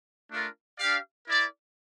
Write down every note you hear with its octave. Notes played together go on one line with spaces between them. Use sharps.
A3 D4 F4 A#4
D4 G4 D5 F5
E4 A#4 D5